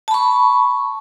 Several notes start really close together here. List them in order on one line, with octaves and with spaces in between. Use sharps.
A5 B5 C#6